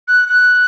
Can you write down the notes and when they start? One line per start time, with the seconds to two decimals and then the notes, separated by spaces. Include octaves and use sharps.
0.08 F#6
0.28 F#6